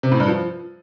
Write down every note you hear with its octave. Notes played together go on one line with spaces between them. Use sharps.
C3
A2
G2
F3